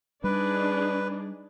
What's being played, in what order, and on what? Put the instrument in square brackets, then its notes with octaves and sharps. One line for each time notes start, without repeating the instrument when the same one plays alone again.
[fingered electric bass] G3 [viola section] D4 D#4 G#4 [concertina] B4